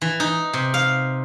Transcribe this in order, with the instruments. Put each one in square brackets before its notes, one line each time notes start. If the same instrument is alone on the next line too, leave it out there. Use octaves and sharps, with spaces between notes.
[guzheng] E3
D#4
C3
F5